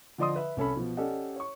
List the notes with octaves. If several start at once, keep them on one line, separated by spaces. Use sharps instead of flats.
D3 F3 D5 D#5 C6 D#6
B4 E5
C2 C#4 A4 B5
B2 F3
C#4 G4 A4 D5 D#5 F#5
C#5 C#6